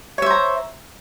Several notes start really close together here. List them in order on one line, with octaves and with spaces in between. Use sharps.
C#5 E5 C5 A#5